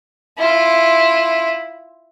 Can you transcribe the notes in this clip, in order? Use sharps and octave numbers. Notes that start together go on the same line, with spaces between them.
E4 F4